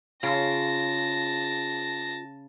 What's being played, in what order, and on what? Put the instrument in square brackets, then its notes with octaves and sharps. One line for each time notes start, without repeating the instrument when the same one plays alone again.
[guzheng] C#3 [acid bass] F4 [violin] A5 A#6